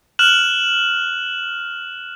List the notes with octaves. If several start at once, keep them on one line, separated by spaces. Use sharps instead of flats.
F6 F#6 E7 F#7